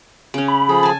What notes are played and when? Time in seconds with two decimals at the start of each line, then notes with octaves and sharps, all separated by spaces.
0.34 C#3 C#4
0.48 B5
0.69 F3 G#4 A4
0.83 G#5 A5